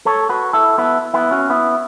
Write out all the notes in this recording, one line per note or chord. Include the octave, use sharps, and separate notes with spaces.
A4 C#5
F#4 B4
E4 A4
B3 E4
B3 E4
C#4 F#4
B3 E4